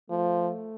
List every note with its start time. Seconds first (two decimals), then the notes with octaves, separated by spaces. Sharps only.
0.10 F3 A3